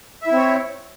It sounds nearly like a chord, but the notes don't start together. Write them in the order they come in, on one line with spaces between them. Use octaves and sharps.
E5 E4 C4 C#5